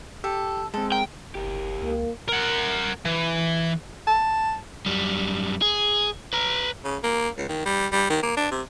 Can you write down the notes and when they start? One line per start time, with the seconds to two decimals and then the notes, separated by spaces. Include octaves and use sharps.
0.24 G4 A4
0.74 G#3 C4 A4
0.92 A#4 G5
1.35 F#1 G4 A#4
1.82 C#2 A#3
2.29 A#4 F#5
3.05 E3
4.07 A5
4.86 F#2 G3
5.62 G#4
6.33 B4 A#5
6.85 C#3
7.03 A#3
7.37 C#2
7.49 D#3
7.65 G3
7.92 G3
8.10 D#3
8.23 A#3
8.37 D4
8.51 C3